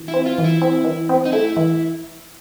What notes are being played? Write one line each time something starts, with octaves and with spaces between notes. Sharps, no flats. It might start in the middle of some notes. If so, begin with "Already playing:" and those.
Already playing: E3
E4
C4
F4
E3
E4
C4
E3
C4
D#4
A3 E4
E3